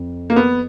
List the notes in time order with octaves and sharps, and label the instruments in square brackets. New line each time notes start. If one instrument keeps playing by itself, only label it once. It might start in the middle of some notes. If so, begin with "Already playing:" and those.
Already playing: [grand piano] F2
[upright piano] A#3
B3